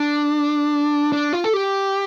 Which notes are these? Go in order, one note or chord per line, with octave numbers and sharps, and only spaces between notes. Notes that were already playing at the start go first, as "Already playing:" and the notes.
Already playing: D4
D4
F4
A4
G4